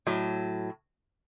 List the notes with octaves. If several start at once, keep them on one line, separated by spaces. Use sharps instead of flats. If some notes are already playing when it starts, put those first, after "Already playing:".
A2 F#3